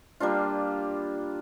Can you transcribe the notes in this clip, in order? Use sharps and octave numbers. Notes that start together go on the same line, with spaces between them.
G3 A#3 D4 F4